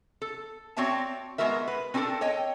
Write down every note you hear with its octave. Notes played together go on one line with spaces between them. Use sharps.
A4
C4 F#4 C#5 D5 E5 A5
G#3 A3 B3 F#4 A#4 E5
B4
C4 D4 F#4 G4 A4 A#4
C#5 D#5 G5